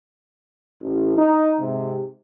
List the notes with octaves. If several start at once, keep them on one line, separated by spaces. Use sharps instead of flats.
A1
D#4
G#2 C3